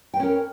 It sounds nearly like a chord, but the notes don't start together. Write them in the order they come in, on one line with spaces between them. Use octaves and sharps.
G5 B4 C#4 A#4